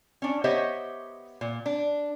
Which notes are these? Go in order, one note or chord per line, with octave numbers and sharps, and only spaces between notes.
C#4 D4
B3 G4 C5 C#5 D#5 E5
A#2
D4